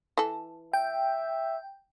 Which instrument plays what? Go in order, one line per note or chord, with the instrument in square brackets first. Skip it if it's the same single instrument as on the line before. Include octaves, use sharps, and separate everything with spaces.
[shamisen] E3 A4
[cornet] E5 [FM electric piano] G5